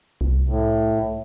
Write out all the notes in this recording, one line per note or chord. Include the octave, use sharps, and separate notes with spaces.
C2
A2